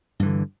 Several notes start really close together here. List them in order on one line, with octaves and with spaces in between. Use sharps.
G2 E3 D3